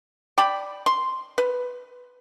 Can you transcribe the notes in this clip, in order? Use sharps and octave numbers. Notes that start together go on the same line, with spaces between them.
D5 G5 B5
C6
B4